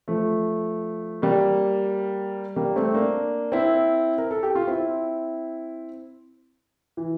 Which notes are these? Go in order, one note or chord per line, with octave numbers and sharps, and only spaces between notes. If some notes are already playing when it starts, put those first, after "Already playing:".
F3 A3
G3 A#3
G3 A#3
A3 C4
A#3 D4
C4 E4
A#4
A4
G4
F4
C4 E4
E3